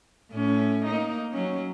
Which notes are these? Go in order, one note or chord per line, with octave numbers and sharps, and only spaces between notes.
A2 C#4
A#3 D#4
F#3 C#4